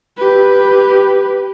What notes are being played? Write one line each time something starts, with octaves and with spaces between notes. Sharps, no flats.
G4 B4